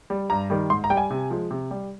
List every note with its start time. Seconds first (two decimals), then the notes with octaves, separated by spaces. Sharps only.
0.10 G3
0.30 G2 A#5
0.50 D#3 G3
0.70 G#2 C6
0.84 A#5
0.90 G3 G5
0.97 G#5
1.10 C3
1.30 F3 G#3
1.51 C3
1.71 G3